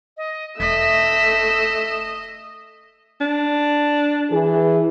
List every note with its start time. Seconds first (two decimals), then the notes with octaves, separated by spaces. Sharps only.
0.17 D#5
0.60 E1 A3 D#5 E6 B6
3.21 D4
4.30 E3 G#4